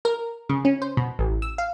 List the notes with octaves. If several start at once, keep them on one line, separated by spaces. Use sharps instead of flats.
A#4
C#3
C#4
C5
B2
A1
E6
F5